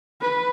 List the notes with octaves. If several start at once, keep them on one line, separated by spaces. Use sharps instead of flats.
B4